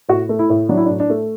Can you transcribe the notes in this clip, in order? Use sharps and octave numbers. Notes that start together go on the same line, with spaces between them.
A2 F#4
A3
E4
A2
F#3 D4
E4
D4
A2
D4
A3